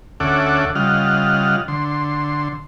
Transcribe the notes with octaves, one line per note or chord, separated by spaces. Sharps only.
D2 C#4 A4 E5 F#5 D6
C#3 G3 F4 D#5 F#5 F6
D3 C6